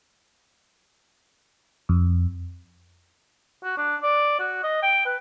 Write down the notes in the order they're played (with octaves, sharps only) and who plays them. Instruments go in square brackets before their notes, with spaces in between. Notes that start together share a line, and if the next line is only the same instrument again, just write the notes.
[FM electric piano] F2
[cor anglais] F#4
D4
D5
F#4
D#5
G5
B4